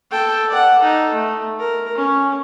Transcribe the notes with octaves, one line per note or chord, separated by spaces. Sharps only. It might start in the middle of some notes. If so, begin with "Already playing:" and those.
A4 G5
D5 F#5
D#4 A4
A3
A#4
C#4